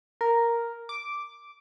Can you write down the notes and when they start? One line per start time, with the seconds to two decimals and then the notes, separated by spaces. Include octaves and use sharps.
0.21 A#4
0.89 D6